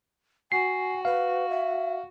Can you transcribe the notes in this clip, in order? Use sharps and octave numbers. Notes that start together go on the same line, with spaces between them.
F#4 G#5 C7
B4 F5
E5